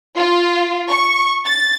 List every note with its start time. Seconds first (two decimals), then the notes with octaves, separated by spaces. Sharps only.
0.17 F4
0.90 C#6
1.45 A6